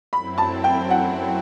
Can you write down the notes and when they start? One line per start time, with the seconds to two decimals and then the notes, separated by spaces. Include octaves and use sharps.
0.13 F#2 F#3 C4 E4 B5
0.38 A5
0.64 G5
0.90 F#5